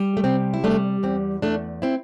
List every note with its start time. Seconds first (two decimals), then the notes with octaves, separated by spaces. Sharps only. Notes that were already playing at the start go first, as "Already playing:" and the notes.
Already playing: G3
0.17 A3
0.24 C3 C4
0.54 E4
0.64 G3 A3 D4
1.03 E2 C4
1.42 E2 A3 D4
1.82 C4 E4